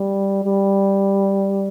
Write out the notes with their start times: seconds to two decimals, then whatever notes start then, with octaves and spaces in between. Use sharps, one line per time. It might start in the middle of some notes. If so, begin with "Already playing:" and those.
Already playing: G3
0.44 G3